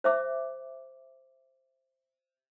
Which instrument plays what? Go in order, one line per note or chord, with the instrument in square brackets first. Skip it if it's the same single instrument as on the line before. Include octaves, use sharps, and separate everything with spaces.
[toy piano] C5 E5 D6